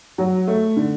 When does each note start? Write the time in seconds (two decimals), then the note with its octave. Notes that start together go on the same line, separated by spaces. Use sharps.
0.18 F#3
0.47 A3
0.77 D3